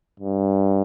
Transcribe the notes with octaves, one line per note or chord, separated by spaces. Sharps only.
G2